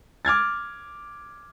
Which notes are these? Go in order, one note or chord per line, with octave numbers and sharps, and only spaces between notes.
D6 F6 G#6 A6